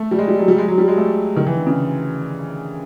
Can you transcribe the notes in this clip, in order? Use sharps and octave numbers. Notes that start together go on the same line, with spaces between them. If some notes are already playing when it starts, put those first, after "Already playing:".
Already playing: A3
G3
G#3
G3
F#3
G3
G#3
F#3
G3
G#3
A3
D#3
E3
D3
C#3